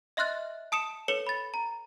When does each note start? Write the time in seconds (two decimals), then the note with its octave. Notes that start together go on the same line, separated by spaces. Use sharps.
0.17 D#5 E5 C6 F6 F#6 A6
0.72 A5 D#6 C#7 E7
1.08 A4 B4 C#5 C#7 E7 G7
1.27 B5 A6
1.54 A#5